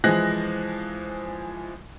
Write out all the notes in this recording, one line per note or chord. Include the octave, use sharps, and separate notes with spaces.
E3 F3 G#3 G#4 F#6 A#6